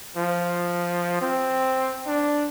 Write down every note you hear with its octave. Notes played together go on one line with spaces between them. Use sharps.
F3
C4
D4